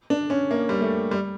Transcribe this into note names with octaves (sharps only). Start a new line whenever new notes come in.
D4
C#4
A#3
G3
A3
G3